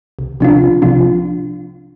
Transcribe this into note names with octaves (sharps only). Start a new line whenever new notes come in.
C2
C3 F3 D4 F4
C2
C3 F3 D4 F4